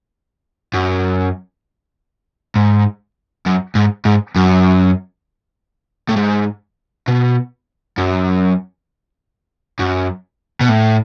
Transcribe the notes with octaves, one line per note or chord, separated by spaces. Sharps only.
F#2
G#2
F#2
G#2
G#2
F#2
A2
G#2
B2
F#2
F#2
B2
A2